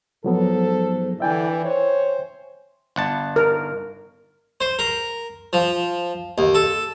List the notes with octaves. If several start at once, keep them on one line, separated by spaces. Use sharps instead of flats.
G#2 F3 F#3 B3 A4
D3 E3 D4 D5 E5 G5 G#5
C5 C#5
G1 F#5 A5
A#4
C5
A#4
F3
D#2
A4